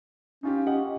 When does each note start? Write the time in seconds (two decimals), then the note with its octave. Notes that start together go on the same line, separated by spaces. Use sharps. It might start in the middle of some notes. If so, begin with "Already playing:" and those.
0.43 C#4 D#4 F4 G4
0.67 G4 D#5 F#5